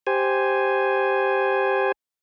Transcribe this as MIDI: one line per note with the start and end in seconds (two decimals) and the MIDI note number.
0.07 1.92 67
0.07 1.92 72
0.07 1.92 80